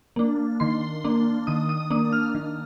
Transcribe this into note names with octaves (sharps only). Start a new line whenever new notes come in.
A#3 D4
D#3 C6
A#3 D4
D#3 D#6
D#6
A#3 D4 D#6
F6
D#3